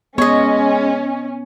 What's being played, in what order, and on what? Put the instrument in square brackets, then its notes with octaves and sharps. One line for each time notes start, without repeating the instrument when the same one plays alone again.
[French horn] G#3 [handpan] B3 [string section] C#4 [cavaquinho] C#5 D#5